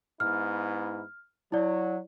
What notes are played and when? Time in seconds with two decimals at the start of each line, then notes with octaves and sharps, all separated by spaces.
0.20 G#2 B3 E4 F6
1.52 F#3 E4 D5